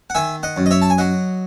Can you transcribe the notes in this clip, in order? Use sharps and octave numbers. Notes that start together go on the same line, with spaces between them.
F#5
D#3 E5 G#5
D#5 F#5
F#2
D#5
C#5 E5
A5
G#5
F#3 D#5 F#5